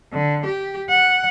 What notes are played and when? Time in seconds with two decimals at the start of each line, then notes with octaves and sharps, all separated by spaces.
0.13 D3
0.46 G4
0.90 F#5